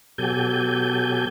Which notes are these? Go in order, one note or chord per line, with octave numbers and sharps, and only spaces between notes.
B2 F#3 G4 A4 G#5 G6